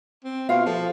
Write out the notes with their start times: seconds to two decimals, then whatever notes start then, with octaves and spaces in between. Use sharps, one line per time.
0.24 C4
0.49 B2 F4 F5
0.66 F3 A4